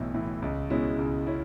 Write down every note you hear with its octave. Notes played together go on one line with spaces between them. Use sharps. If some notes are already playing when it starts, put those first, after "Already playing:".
Already playing: B1 A2 E3
A2 E3
C#2
B2 G#3 C#4 E4
C#2
C#4 E4